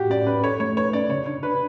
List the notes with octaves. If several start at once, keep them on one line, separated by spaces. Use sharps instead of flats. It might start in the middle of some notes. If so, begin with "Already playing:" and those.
Already playing: A2 F#4 G4
C#4 D5
C#4 B4
A4 C#5
A3 C#5
B4 C#5
C#4 D5
C#3 C#5
D4 C#5
D4 B4